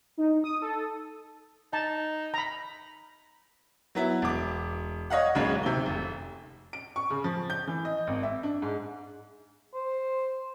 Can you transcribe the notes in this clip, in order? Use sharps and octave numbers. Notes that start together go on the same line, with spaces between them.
D#4
D#6
A4
D#4 A5
A#5 B5
F#3 B3 E4
E1 D6
C#5 D#5 F5 F#5
D1 B1 C#3 G#3 A#3 C#5
D1 C3 D#3 G7
F1
D7
C#6
C#3
F3
G6
E3
D#5
G#1
E5
D4
G#2
C5